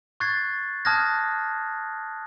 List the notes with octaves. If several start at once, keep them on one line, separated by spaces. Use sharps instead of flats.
C#6 F#6 G#6 A6 C7
A5 D#6 F6 F#6 G#6 A#6